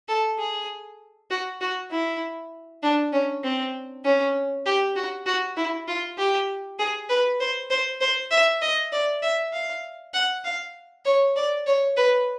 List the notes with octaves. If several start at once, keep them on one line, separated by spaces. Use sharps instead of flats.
A4
G#4
F#4
F#4
E4
D4
C#4
C4
C#4
G4
F#4
F#4
E4
F4
G4
G#4
B4
C5
C5
C5
E5
D#5
D5
E5
F5
F#5
F5
C#5
D5
C#5
B4